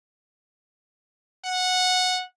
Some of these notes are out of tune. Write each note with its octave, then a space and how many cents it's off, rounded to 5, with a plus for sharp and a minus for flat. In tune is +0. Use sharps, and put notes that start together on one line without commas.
F#5 -10